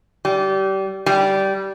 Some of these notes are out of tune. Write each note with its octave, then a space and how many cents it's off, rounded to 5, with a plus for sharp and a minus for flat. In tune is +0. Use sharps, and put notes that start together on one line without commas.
G3 -25
G3 -15